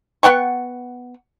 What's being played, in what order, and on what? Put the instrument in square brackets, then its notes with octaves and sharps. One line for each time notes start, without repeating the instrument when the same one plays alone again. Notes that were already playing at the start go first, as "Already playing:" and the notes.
[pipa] B3 F#5 G5 C#6